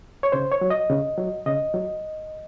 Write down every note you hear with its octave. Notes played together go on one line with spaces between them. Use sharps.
C#5
C#3 C5
C#5
F#3
D#5
C#3
F#3
C#3 D#5
F#3